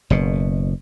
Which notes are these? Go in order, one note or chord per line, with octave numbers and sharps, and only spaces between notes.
F#1 B2